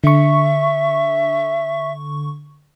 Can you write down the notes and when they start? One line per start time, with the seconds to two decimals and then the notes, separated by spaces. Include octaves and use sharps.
0.04 D3 E5 C#6